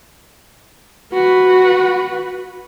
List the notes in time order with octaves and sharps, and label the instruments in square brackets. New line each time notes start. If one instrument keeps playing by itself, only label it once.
[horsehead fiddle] F#4 B4